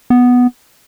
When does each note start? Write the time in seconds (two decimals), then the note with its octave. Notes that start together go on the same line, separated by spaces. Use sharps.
0.10 B3